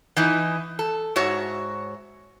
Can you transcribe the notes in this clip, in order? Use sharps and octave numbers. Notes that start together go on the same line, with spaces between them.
E3 D#4 E4
A4
G#2 F#4 C#5 E5